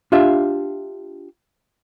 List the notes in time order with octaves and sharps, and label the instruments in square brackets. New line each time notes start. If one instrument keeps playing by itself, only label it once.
[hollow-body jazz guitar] D4 F4 G4 E5 F5